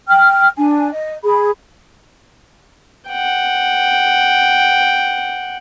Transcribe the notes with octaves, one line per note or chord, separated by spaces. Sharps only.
G5 F6
D4 G#5
D#5
G#4 B5
F#5 G5